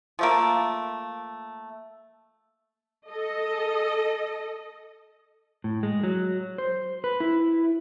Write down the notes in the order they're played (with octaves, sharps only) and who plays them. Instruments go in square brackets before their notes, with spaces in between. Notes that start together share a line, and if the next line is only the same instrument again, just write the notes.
[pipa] F3 A3 A#3
[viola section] A4 D#5
[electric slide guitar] A2
G#3
F#3
C5
B4
E4